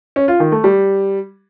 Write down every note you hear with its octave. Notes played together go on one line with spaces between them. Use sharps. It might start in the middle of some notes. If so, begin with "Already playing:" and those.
C#4
F4
D#3
A3
G3